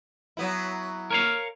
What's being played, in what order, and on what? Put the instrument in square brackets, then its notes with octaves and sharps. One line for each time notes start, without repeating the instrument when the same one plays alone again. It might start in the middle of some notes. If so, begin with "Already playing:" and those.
[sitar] F#3 B3 E4
[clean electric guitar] A#4 C#5 F5